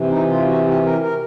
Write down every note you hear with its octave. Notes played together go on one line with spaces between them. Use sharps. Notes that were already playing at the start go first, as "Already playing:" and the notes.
Already playing: C3 E3
D#4
F4
F#4
G4
A#4
A#4